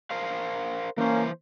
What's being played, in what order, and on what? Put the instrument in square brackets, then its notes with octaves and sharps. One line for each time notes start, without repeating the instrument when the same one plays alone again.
[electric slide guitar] A#4 C5 F5
[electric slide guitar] E3 C5 [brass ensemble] A#3 C#4